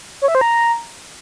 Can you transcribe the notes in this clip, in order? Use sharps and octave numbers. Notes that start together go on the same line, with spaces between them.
C#5
E5
C5
A#5